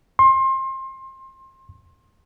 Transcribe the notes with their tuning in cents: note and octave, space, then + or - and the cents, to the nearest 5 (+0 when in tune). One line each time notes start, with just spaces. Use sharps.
C6 +25